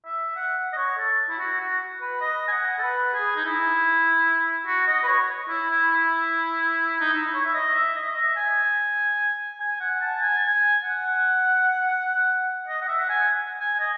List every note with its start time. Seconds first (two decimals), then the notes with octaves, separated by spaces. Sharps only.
0.05 E5
0.36 F#5
0.73 D#5
0.77 C#5
0.98 A4
1.29 E4
1.39 F#4
1.60 F#4
2.01 B4
2.21 D#5
2.48 G#5
2.52 F#5
2.78 A4
2.83 B4
3.13 G#4
3.36 D#4
3.45 E4
4.67 F#4
4.87 D#5
5.03 B4
5.08 C#5
5.49 E4
5.70 E4
5.91 E4
7.00 D#4
7.13 E4
7.34 C#5
7.45 E5
7.54 D#5
7.74 E5
7.96 D#5
8.16 E5
8.36 G#5
9.60 G#5
9.80 F#5
10.01 A5
10.21 G#5
10.83 F#5
12.68 D#5
12.82 F#5
12.88 E5
13.01 F#5
13.09 G#5
13.59 G#5
13.80 D#5